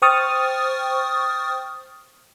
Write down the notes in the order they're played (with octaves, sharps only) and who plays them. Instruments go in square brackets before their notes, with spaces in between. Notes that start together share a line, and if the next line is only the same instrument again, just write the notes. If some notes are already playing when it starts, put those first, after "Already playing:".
[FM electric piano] C5 G5 C#6 D#6 F6 A6